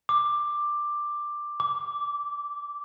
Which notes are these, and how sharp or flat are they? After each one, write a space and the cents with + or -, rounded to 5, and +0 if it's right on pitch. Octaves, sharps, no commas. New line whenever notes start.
D6 +10
D6 -15